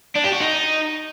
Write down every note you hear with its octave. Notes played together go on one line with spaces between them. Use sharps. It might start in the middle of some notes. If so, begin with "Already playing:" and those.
D4
G4
F#4
D#4